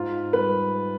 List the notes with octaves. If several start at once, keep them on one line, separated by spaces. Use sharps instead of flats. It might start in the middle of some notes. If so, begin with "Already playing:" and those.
Already playing: G#2 F4
G3 B4